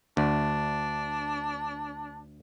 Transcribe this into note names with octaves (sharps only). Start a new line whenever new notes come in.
D2 D4